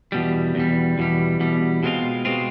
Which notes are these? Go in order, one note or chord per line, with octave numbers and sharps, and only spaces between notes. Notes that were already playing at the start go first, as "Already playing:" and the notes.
E2 B2 G3
E2 B2 G3
E2 B2 G3
E2 B2 G3
B2 G#3 C4 F4
B2 G#3 C4 F4